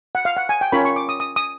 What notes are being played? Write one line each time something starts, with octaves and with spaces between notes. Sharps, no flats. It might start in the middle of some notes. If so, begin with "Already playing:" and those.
F#5
F5
F#5
G#5
G5
C#4 F4 A#4 C#5 B5
C#6
D6
D#6
D#6
D#6